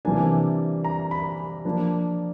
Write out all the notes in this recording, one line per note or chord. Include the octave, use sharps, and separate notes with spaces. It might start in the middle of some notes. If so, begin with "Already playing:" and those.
C3 E3 G3 A#3 D4 G#5
A#5
B5
F3 A#3 D4